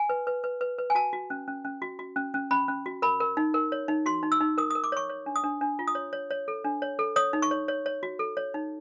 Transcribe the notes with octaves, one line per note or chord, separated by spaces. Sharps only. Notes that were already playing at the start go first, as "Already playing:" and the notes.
Already playing: G#5
B4
B4
B4
B4
B4
G#5
F#4 A5
F#4
C#4
C#4
C#4
F#4
F#4
C#4
C#4
C#4 B5
C#4
F#4
A#4 B5
A#4
D#4
A#4
C#5
D#4
F#4 C6
D#4
E6
D#4
A#4 D#6
D#6
A#4
D6
C#5 C#6
C#5
D4
D#6
D4
D4
F4
D#6
C#5
C#5
C#5
A4
D4
C#5
A4
C#5 D#6
D#4
C#6
C#5
C#5
C#5
F#4
A4
C#5
D#4